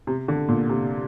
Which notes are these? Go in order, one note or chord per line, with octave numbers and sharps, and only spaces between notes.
C3
D3
A#2
C3